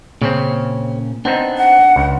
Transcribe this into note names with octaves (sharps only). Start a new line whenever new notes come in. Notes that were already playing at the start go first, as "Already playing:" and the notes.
A#2 C#3 C4 C#4
B3 C4 D4 D#4
F#5
C#2